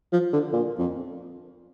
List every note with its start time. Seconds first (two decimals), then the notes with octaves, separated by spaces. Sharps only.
0.12 F3
0.33 D3
0.53 A#2
0.78 F2